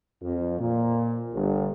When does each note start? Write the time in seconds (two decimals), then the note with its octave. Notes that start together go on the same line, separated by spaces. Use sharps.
0.22 F2
0.60 A#2
1.33 G1